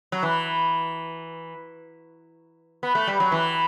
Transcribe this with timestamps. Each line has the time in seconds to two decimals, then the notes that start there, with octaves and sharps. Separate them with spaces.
0.12 F#3
0.23 E3
2.83 B3
2.95 A3
3.07 G3
3.20 F#3
3.32 E3